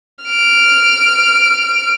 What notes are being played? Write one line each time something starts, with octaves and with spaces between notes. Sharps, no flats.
F6 D7